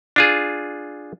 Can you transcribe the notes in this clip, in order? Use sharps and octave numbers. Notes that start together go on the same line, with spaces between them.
D4 F4 G#4